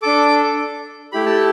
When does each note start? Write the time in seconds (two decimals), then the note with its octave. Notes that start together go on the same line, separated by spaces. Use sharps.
0.02 D4 A4 D6
1.12 A3 E4 G4 B5
1.26 A5